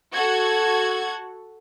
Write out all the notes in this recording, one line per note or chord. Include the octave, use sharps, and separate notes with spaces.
F#4 A4 F#5 G#6